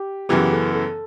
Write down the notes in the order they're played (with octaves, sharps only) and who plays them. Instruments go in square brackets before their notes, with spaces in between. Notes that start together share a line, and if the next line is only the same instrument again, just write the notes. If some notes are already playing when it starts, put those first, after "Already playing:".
Already playing: [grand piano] G4
[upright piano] F#2 C#3 E3 B3 [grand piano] G4
[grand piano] A4
A4